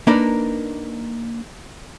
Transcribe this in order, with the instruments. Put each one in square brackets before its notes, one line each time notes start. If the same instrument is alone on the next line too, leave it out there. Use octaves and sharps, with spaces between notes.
[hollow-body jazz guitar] A#3 D4 D#4 A#4 B4 D5